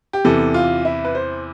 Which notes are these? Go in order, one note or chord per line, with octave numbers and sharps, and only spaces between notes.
G4
E2 C3 E3 A4
F4
E4
B4
C5